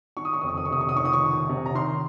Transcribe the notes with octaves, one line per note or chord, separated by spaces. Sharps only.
D#3 C#6
D#6
C#6
F2 D#6
C#6
D#6
C#6
C3 D#6
C#6
D#6
D#3 C#6
D#6
C#6
D#3
C3
A#5
D#3 C6